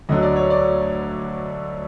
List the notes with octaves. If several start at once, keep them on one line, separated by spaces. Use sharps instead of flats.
D2 D3 F#3 D#5
D5
C#5
D5